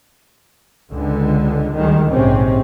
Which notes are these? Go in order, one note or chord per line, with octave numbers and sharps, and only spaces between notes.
C#2 D3 G#3
D2 D#3 G3 G#3
A#1 G#2 C3 C4 C#4